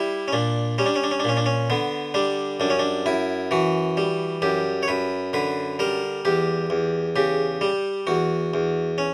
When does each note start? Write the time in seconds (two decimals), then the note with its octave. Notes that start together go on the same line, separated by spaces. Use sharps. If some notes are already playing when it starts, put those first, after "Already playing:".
Already playing: G3 E4
0.28 C#4
0.33 A#2 D4
0.78 G3 C#4
0.86 D4
0.96 C#4
1.04 D4
1.11 C#4
1.20 D4
1.24 A#2 C#4
1.37 D4
1.46 C#4
1.70 D3 B3
2.14 G3 D4
2.60 F#2 D4
2.70 C#4
2.79 D4
3.06 F#2 E4
3.51 E3 F#4
3.97 G3
4.42 F#2 G4
4.83 C#5
4.88 F#2 B4
5.33 D3 B4
5.79 G3 A#4
6.25 E2 G4
6.70 E2
7.16 C#3 G4
7.61 G3
8.07 E2 F#4
8.54 E2
8.98 C#4